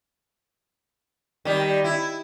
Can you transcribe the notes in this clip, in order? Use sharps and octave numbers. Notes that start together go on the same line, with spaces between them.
D#3 G3
E4